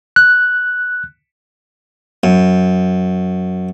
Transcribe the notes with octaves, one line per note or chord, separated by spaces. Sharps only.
F#6
F#2